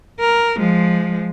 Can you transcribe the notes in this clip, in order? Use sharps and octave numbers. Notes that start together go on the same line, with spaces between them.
A#4
F3 G#3